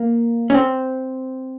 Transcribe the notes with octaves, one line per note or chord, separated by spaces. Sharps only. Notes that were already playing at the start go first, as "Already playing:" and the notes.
Already playing: A#3
C#4
C4